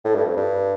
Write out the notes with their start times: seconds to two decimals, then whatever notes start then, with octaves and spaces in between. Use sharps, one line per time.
0.05 A2
0.15 G2
0.25 F2
0.37 G2